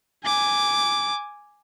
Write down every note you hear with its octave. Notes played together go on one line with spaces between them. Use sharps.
G#5 D6